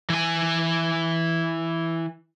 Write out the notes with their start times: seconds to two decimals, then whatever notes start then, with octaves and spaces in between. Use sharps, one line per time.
0.10 E3 G#5